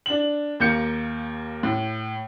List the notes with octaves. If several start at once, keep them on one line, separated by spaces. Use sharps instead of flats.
D4 F#7
D#2 A#3 G6 C#7
A2